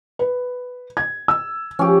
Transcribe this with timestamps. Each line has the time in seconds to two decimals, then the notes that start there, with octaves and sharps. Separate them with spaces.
0.19 B4
0.97 G#6
1.28 E6
1.79 F3 C#4 G4